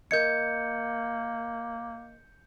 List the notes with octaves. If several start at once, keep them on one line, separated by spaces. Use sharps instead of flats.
A#3 A#4 D#5 G6 G#6 C#7